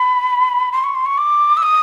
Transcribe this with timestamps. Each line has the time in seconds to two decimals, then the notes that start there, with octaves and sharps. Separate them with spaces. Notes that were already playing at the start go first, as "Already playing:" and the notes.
Already playing: B5
0.72 C6
0.84 C#6
0.95 C6
1.06 C#6
1.18 D6
1.57 E6
1.63 D#6